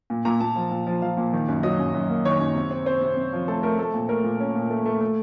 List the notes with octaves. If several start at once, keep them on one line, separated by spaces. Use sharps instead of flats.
A#2
A#2 A#5
A#2 A5
F3
A#2
F3
F3 F5
A#2
D#3
F#2
F#3 D#5
F#2
F#2
A#3
D#3 C#5
F#2
C3
C4
C4 C5
C3
C3
F3
A3 A4
A3 A#4
A3 A4
A#2
A3 A#4
A#2
C#4
A#2
A3
A3
A3